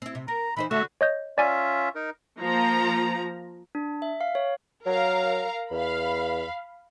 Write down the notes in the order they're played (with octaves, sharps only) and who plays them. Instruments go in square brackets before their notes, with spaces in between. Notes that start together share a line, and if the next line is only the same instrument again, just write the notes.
[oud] C4 E4
C3
[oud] A#4 [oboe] A#5
[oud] E3 D#4 C5 [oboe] B5
[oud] D3 [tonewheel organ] A3 E5 [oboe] F#4
[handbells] C#5 D#5 G6
[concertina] C#4 F4 E5 [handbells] D5 G#5
[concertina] D#4 A#4
[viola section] F3 A#3 A#5
[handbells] D4
E5
F5
C#5
[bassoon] F#3 [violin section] A#4 F5 A#5
[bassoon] E2 [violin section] F5 B5